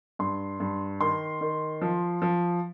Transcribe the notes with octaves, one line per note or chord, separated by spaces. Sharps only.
G2 C6
G2
D#3 C6
D#3
F3
F3